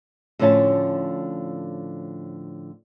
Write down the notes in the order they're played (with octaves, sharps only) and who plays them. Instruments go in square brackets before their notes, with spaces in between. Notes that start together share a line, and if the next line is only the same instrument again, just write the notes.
[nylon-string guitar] A2 D3 F3 C#4 E5 A5